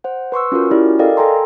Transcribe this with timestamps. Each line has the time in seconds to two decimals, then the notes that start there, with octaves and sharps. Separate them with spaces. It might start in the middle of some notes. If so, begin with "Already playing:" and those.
0.04 C5 F#5
0.32 B4 C6 C#6 E6
0.52 C#4 F4 F#4 A#4
0.71 C#4 E4 F#4 G4 D5
0.99 A4 A#4 D5 D#5 F5 G5
1.17 A4 G5 G#5 A#5 C6